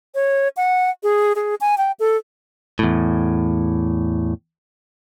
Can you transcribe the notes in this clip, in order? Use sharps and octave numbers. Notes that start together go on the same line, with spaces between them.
C#5
F#5
G#4
G#4
G#5
G5
A4
E2 A2